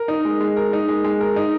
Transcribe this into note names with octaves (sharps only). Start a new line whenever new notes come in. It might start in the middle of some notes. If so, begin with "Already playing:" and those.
Already playing: A#4
D#4
G#3
G#3
A#4
D#4
G#3
G#3
A#4
D#4